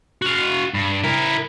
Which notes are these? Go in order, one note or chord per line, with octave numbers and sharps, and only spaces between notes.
F#4 F5
G2
E4 A#4